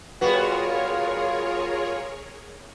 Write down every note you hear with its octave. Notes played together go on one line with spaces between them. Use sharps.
G3 B3 F4 F#4 G#4 A#4 B4 C#5